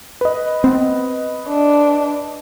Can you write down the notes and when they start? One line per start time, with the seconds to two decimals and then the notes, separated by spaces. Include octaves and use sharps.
0.21 B4 D#5
0.64 B3 C4
1.48 D4